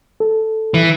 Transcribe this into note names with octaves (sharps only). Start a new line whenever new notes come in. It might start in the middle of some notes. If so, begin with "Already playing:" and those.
A4
E3